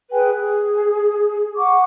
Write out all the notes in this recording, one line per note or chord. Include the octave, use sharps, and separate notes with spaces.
G#4 B4 G5 G#5
G#4
F#5 C#6 D6